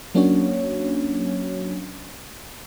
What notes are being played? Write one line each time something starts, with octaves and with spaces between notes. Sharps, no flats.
F#3 A#3 C#4 D4 F#4 C#5